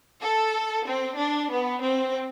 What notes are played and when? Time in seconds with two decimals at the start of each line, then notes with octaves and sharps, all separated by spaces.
0.22 A4
0.88 C4
1.19 D4
1.51 B3
1.84 C4